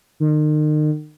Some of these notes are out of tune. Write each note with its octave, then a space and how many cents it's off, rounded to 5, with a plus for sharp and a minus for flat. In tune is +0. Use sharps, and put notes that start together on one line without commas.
D#3 -40